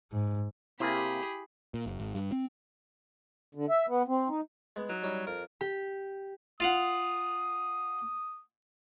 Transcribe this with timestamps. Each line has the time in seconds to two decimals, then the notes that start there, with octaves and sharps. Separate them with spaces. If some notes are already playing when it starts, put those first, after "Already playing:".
0.12 G#2
0.80 C3 A#3 E4 G4 G#4 B5
1.74 A#2
1.86 F#1
2.00 G#1
2.15 G2
2.32 C4
3.55 D3
3.69 E5
3.88 B3
4.08 C4
4.29 D#4
4.76 G#3 B3
4.89 F#3 D#4
5.03 G3 C#4 D#4
5.27 F2 A#4
5.61 G4
6.60 F4 F5 F#5 D#6